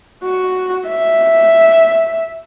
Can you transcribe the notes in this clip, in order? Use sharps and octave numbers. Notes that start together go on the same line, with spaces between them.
F#4
E5